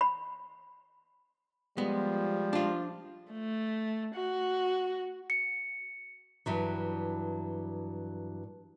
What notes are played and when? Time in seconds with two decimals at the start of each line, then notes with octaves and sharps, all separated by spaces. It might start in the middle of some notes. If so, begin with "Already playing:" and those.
0.01 B5
1.78 F3 G3 G#3 B3
2.53 D4 F4
3.32 A3
4.15 F#4
5.30 C#7
6.46 G2 E3 F#3